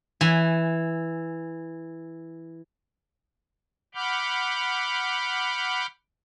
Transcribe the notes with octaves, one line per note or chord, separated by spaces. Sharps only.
E3 G#5
F#5 B5 D6 F6 G6